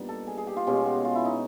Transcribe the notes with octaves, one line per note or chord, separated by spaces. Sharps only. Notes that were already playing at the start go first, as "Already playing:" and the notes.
Already playing: A#2 G3 B3 D4 D#4
A4
G#4
G#4
G4
F4
B2 G#3 C#4 G4
F#4
F4
E4
D#4